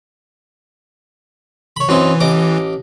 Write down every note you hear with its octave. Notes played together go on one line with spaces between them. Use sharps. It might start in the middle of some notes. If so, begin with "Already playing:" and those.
C#5 B5
F#2 E3 C4 D#4
A1 D#5 D6